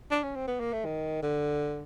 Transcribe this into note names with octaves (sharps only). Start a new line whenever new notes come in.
D4
C#4
C4
B3
A#3
A3
D#3
D3